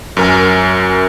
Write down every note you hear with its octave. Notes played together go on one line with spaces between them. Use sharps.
F#2 A#4 G#5